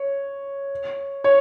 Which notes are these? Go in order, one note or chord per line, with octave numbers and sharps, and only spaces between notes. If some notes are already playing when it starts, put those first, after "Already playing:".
Already playing: C#5
C#5